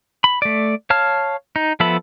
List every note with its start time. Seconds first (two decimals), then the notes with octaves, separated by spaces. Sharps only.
0.24 B5
0.42 A3 D5
0.90 C#5 F5 A5 F6
1.56 D#4
1.80 F3 B3 A4 E5 B5